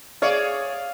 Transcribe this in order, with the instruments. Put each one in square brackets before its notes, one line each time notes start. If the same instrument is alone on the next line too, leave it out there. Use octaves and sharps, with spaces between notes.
[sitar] G#4 C#5 D5 [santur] F5